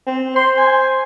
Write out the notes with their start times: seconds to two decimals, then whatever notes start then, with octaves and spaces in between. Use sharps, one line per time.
0.06 C4
0.36 C5 C6
0.57 G#5